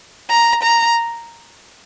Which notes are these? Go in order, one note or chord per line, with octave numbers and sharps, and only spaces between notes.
A#5
A#5